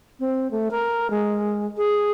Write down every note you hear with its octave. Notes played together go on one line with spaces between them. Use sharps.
C4
A3
A#4
G#3
G#4